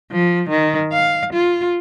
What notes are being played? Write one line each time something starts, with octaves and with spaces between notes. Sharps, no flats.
F3
D#3
F5
F4